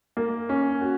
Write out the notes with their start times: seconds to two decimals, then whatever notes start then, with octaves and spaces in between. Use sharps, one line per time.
0.17 A#3
0.49 C#4
0.81 F#4